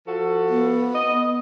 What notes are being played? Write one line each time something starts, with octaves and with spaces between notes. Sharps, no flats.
F3 F#4 A4
B3
D#5